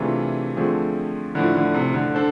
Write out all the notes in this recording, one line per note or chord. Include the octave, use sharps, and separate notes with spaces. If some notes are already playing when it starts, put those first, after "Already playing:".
Already playing: C3 E3 A3 D4 F4 G#4
D3 F3 A3 C4 G#4
A2 D3 F3 A3 E4
D3
C3
D3
D4 A4 C5